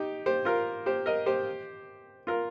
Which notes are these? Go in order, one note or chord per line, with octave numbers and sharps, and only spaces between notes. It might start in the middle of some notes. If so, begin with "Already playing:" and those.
Already playing: D#4 G4
G4 C5
F4 A#4
G4 C5
A#4 D#5
G4 C5
F4 A#4